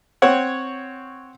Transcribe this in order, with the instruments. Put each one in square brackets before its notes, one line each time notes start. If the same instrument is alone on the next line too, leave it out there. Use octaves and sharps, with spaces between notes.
[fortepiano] C4 C#5 F#5